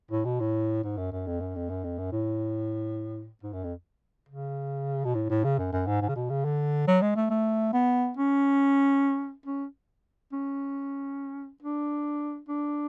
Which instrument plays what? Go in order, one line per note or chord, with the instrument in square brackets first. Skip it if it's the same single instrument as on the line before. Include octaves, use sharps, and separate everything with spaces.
[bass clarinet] A2
B2
A2
G#2
F#2
F#2
F2
F#2
F2
F#2
F2
F#2
A2
G#2
F#2
F2
C#3
B2
A2
A2
C#3
F#2
F#2
G#2
G#2
C#3
B2
C#3
D3
F#3
G#3
A3
A3
B3
C#4
C#4
C#4
D4
D4